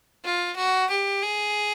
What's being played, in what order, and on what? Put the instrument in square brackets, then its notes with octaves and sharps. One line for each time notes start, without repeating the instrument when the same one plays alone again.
[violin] F4
F#4
G4
G#4